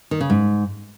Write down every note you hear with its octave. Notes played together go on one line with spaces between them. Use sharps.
D#3
C#3
G#2